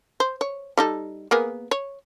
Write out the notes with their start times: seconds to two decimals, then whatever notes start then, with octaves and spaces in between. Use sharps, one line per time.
0.20 C5
0.41 C#5
0.77 G3 D#4 A4
1.31 A#3 B3 G#4
1.71 C#5